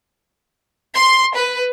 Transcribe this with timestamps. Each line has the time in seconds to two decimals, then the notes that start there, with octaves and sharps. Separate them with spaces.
0.97 C6
1.36 B4